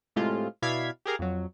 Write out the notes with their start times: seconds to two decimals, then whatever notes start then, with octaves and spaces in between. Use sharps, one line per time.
0.16 A2 C3 G#3 A3 F4
0.62 B2 E4 D5 F5 G#6 B6
1.06 G4 G#4 A#4 F5
1.19 F2 F#3